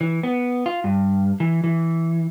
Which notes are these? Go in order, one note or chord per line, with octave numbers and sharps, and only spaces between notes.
E3
B3
F4
G2
E3
E3